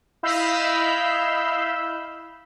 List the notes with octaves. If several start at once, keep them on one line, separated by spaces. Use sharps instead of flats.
E4 D#5 F5 B5 E6 G6